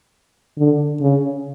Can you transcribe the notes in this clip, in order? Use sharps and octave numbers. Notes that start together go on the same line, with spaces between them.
D3
C#3